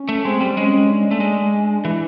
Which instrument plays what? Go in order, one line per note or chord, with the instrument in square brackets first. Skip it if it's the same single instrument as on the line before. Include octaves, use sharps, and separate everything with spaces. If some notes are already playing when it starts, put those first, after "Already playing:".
Already playing: [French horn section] C#4
[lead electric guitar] A3
[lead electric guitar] G#3 [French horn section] C4
[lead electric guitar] G3
[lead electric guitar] G#3 [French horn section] C#4
[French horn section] D4
[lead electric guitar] A3
G#3
E3